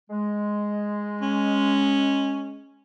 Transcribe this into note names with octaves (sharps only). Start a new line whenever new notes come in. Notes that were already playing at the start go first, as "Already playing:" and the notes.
G#3
C#4